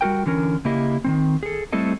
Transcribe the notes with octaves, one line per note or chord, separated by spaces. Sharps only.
G3 F#4 A#4 G5
D3 E3 C#4 A#4
C#3 A#3 E4 G4 D#5
D#3 E3 C4
G#4 A4
G3 A3 C4 E4 A4 D#5